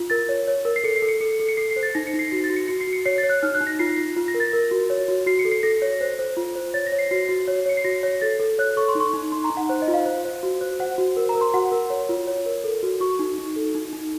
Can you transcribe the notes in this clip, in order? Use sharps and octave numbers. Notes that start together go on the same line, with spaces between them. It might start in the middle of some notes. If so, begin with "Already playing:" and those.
Already playing: F4
A#4 A6
C#5
C#5
A#4
C7
A4 C#7
C7
A4
C#7
A4 C#7
A4
C#7
A4 C7
C7
C5
A6
D#4 A#6
C#7
D#4
C7
F#4 A#6
A6
F#4
C#7
F#4 C#7
C7
F#4
C#7
C#5 C7
A6
C#5
F#6
D#4 F6
F#6
D#4
A#6
F4 C7
F4
F4
A#6
A#4
A6
A#4
F#4
C#5
F#4
F#4 C7
C#7
A4
C7
A4 A#6
C#5
C5
C5
F4
C5
C#5 A6
A#6
C#5
C7
F#4 C7
F#4
C#5
C#5 C#7
C7
F#4 A#6
C#5
A4 A6
A4
C#5 F#6
A4 C#6
C6
D#4
C#6
D#4
D#4 C6
A#5
D#4
F#5
C5
D#5
F4
F5
C5
C5
F#4
C5
C5 F#5
F#4
A#4
A#5
A#4
C6
F#4 F#5
A#4
C#5
F4
C#5
A#4
A4
F#4
F#4 C#6
D#4
D#4
A4
D#4
D#4